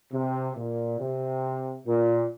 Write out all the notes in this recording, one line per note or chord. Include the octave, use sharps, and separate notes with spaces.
C3
A#2
C3
A#2